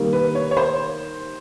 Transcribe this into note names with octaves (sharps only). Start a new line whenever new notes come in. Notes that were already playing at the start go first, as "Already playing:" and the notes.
Already playing: D#3 G3 A#3
B4
C#5
C#5
C5